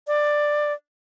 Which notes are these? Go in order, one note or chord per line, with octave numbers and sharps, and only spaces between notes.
D5